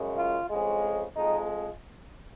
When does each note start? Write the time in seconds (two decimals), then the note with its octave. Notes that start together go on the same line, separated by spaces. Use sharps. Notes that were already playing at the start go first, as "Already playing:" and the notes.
Already playing: F#2 C#3 G#3
0.16 F4
0.49 F2 C#3 G#3
1.15 F2 F3 G#3 D#4